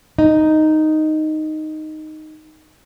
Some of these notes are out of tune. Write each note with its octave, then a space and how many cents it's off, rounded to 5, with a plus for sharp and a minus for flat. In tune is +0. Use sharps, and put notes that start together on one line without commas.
D#4 -5